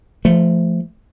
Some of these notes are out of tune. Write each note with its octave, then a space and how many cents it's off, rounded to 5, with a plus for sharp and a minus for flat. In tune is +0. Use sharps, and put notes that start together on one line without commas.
F3 -20 A3 +0